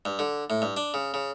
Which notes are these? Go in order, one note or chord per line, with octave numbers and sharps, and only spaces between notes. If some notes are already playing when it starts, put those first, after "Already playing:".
G2
D3
A2
G2
D4
C#3
C#3